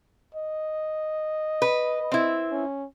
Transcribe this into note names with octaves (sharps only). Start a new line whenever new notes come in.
D#5
B4
C4 E4
C#4